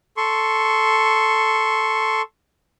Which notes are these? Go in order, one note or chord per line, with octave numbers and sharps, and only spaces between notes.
A4 C6 C#6